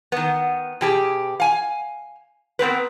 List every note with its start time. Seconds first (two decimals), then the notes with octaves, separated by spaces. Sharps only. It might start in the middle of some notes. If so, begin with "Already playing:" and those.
0.12 D#3 B3
0.81 B2 G4 G#4
1.40 F5 G#5
2.59 B3 C4 A#4 B4